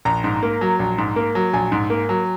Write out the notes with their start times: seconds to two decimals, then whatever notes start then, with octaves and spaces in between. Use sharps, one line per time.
0.05 A#1 A#5
0.24 G#2
0.43 A#3
0.61 F#3
0.79 A#1
0.98 G#2
1.16 A#3
1.35 F#3
1.53 A#1 G#5
1.72 G#2
1.90 A#3
2.09 F#3